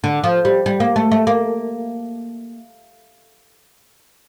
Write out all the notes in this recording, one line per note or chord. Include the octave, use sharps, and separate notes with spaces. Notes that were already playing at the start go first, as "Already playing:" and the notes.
D3
F3
G3
G3
A#3
A3
A3
A#3